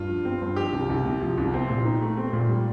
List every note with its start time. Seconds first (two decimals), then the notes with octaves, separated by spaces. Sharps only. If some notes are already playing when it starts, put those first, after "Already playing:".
Already playing: G2 F4
0.09 F3
0.25 C4
0.42 G2
0.56 F3 G4
0.73 C2
0.89 C2
1.05 C3
1.22 F3
1.38 C2
1.54 C4
1.70 A#2
1.85 D#4
2.02 A3
2.17 C4
2.33 A#2
2.49 G3